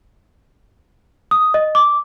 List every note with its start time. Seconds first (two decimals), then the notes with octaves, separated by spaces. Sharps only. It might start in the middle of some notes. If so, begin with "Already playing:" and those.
1.31 D#6
1.54 D#5
1.75 D6